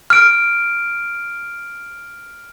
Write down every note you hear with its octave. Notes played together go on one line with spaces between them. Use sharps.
F6 D7